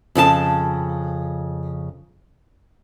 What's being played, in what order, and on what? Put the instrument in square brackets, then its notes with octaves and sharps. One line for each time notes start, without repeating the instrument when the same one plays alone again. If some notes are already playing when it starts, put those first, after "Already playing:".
[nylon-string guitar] F2 C#3 G4 A5